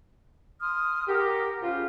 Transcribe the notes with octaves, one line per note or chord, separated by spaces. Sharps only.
C6 D#6 F6
G4 A#4 F#5
C#3 F4 C5